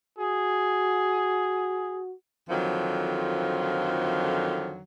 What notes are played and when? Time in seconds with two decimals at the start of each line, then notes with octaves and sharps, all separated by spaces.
0.19 F#4 G#4
2.49 F2 D3 D#3 F3 F#3